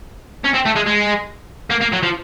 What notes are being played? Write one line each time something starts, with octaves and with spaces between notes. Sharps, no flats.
C#4
C4
A3
G#3
G#3
A#3
A#3
F#3
F3